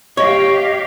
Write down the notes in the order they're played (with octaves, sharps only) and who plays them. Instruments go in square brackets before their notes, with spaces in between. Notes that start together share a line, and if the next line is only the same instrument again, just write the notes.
[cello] G4 F5 [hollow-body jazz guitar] C#5 [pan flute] D#5